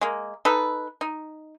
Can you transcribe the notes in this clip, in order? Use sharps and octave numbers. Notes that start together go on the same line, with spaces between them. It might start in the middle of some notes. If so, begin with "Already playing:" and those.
G#3 A#3
D#4 A4 B4
D#4